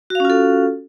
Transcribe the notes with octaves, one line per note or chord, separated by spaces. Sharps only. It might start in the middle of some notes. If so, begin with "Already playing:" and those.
C#4 F4 F#4 A4 F5